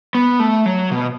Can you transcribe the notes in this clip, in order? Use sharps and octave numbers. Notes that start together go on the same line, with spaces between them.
B3
A3
F#3
B2